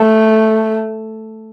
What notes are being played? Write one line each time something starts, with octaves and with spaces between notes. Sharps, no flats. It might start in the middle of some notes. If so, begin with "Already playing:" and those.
Already playing: A3